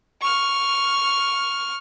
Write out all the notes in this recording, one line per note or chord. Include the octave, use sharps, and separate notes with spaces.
C#6 F6